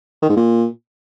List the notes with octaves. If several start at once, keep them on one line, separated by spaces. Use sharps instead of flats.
D#3
G#2
A#2